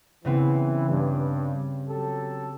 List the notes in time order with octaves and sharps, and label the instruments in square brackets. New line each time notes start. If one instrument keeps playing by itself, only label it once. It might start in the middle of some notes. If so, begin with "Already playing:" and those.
[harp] C#3 B3 C4 [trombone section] E3
[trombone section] G2
F#3 G4 A4